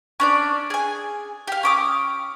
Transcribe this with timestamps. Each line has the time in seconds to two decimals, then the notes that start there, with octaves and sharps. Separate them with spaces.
0.20 C#4 D4 D5
0.70 G#4 G#5
1.47 G4 F5
1.63 C#4 D6 D#6